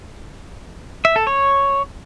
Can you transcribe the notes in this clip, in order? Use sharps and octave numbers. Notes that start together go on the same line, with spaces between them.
E5
A4
C#5